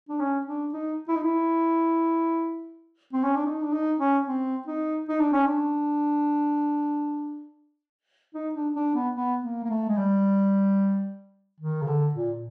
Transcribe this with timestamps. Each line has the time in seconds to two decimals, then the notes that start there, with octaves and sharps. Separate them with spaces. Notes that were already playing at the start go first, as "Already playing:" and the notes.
0.09 D4
0.19 C#4
0.47 D4
0.73 D#4
1.08 E4
1.16 D#4
1.23 E4
3.13 C4
3.24 C#4
3.35 D4
3.45 D#4
3.62 D4
3.72 D#4
3.99 C#4
4.27 C4
4.67 D#4
5.08 D#4
5.20 D4
5.32 C#4
5.45 D4
8.34 D#4
8.54 D4
8.75 D4
8.95 B3
9.15 B3
9.42 A#3
9.64 A#3
9.70 A3
9.89 G#3
9.97 G3
11.60 D#3
11.82 C#3
11.87 D3
12.14 A#2